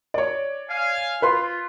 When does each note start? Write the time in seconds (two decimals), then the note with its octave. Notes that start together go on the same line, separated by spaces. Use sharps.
0.14 C#5 D5
0.69 F5 G#5
1.22 F4 B4 C6